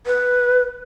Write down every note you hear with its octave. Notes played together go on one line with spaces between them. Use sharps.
B4